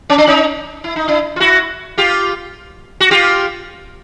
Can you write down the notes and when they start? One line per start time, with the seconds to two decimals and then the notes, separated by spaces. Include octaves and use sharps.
0.10 C#4
0.18 D4
0.27 C#4 D#4
0.84 E4
0.96 D#4
1.08 D4 E4
1.36 F4
1.40 E4 F#4
1.98 F4 G4
3.00 F#4
3.11 F4 G4